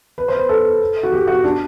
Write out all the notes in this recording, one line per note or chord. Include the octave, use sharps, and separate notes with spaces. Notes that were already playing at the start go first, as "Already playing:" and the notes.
B4
C5
B4
A4
F#4
G4
F#4
D4